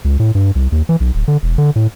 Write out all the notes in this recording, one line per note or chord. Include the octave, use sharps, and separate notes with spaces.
C#2
A2
G2
C2
D#2
E3
B1
D1
D3
E1
D3
A2